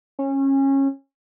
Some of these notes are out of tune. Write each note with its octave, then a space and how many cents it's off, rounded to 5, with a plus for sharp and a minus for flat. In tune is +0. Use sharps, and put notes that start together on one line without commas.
C#4 -25